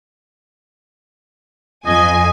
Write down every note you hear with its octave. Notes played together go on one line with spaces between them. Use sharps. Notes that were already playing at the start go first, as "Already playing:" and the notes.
F2 D#5 G#5